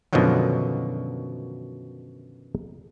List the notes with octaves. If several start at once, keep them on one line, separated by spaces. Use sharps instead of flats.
F#2 B2 D3 D#3 F3 F#3